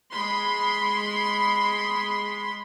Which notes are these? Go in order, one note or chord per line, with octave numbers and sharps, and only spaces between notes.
G#3 B5 C6